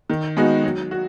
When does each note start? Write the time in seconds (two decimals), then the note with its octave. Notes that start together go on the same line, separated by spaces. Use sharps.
0.10 D#3
0.37 G#3 B3 D#4 F#4
0.64 F#3
0.91 F#4